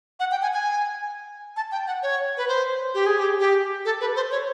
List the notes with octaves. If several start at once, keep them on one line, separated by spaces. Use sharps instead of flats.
F#5
G5
G#5
G#5
A5
G5
F#5
C#5
B4
C5
G4
G#4
G4
G4
A4
B4
C5
C#5